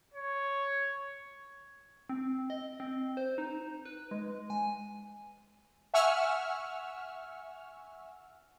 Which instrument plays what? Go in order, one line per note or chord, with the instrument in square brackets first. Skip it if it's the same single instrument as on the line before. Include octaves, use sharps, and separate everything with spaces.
[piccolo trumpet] C#5
[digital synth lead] C4
D#5
C4
C5
D#4
B4
G#3
G#5
[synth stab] E5 F#5 G#5 C#6 E6 F6